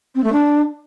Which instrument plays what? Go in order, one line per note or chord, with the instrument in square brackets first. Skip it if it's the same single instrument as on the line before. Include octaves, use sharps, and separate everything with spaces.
[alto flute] C4
A3
D4